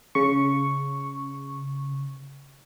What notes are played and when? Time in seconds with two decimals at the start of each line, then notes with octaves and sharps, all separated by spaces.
0.15 C#3 C#6